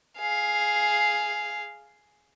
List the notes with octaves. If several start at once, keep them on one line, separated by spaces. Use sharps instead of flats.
G#4 F5